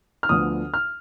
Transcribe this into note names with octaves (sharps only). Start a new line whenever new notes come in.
F6
D2 D3 F3 B3 D#6
F6